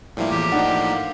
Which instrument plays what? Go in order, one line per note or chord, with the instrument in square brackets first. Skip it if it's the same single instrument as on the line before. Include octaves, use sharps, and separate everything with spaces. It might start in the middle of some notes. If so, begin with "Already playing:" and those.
[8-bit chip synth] A2 F3 A#3 [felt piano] G3 E4
[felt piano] E2 [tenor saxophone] G4
[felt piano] D4 D#4 F#5
F5